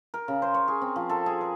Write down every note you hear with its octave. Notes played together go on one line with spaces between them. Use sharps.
A#4
C#3
C5
C#5
G#4
C4
F3
A4
G#4
A#4